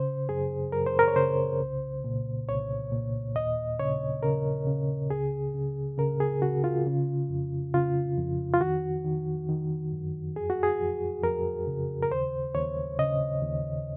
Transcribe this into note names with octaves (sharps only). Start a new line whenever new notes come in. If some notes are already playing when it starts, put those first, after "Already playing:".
Already playing: C#3 C5
F#2 G#4
F#2 A#4
C5
A#4
C#5
C#3 C5
C2
A#2
C2 C#5
A#2
D#2 D#5
C#3 C#5
C#3 A#4
C#3
C#2 G#4
C#3
C#3 A#4
G#4
C#3 F#4
F4
C#3
F2
C#3 F4
F2
F4
D#3 F#4
D#3
D#3
F#2
F2 G#4
F#4
G#4
F2
F2 A#4
C#3
A#4
D#2 C5
D#2 C#5
C#3 D#5
D#2